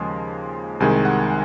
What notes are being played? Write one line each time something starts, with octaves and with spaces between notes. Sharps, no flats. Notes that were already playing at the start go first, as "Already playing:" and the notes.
Already playing: D#2 C#3 F3 G#3 C6
C2 C3 D#3 G#3 G#5
F#5